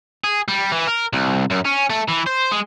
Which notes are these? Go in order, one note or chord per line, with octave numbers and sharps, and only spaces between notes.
G#4
G3
E3
A#4
C2
F#2
C#4
A3
E3
C5
G#3